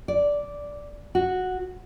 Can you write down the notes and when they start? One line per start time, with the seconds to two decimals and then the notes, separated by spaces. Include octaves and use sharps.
0.08 D5
1.15 F#4